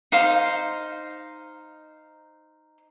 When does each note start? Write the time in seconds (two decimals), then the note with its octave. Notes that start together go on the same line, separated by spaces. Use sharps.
0.12 D#4 C5 F5